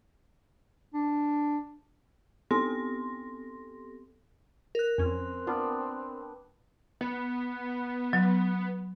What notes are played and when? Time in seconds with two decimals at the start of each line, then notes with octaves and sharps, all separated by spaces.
0.94 D4
2.51 B3 C4 G4 A4 C6 A#6
4.75 A#4 F#6
4.98 F2 C4 C#4 G#5
5.47 B3 D4 F4 G5
7.01 B3
8.13 F#3